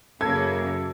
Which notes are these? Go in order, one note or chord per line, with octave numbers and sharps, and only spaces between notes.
F#2 C#3 A#3 A4 G#6